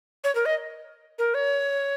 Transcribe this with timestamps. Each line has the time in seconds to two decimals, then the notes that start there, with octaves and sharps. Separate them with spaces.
0.24 C#5
0.35 A#4
0.46 D#5
1.19 A#4
1.34 C#5